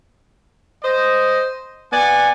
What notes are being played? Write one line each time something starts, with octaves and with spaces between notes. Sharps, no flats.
C5 D#5
B3 D5 F#5 G#5